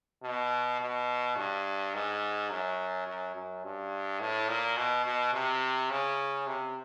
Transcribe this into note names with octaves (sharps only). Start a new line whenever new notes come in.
B2
B2
G2
G#2
F#2
F#2
F#2
G2
A2
A#2
B2
B2
C3
C#3
C3